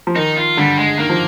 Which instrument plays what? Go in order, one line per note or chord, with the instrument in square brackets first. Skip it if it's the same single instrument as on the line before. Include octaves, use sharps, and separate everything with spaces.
[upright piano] F3
[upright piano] D#3 [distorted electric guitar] D#4
[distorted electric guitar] F4
[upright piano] D3 [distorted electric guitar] G3
[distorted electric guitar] G#3
[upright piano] D#3 [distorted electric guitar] A#3
[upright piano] F3